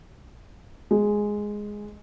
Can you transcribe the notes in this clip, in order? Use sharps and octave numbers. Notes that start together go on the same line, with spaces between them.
G#3